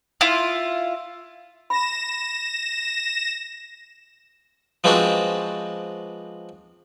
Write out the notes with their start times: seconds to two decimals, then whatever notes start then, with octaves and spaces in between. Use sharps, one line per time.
0.21 E4 F4
1.70 B5 A#6 E7
4.84 F3 G#3 B3 C4 D4 F#4